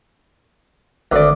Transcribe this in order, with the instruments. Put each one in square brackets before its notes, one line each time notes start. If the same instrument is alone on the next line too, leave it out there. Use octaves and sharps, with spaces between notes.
[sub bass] G#1 [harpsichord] D2 D5